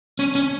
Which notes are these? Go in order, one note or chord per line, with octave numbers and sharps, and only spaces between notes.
C#4
C#4